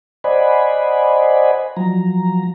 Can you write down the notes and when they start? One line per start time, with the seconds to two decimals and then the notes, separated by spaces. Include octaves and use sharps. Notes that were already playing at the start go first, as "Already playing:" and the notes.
0.24 C5 D5 D#5 F#5 G#5 B5
1.77 F3 F#3 A#5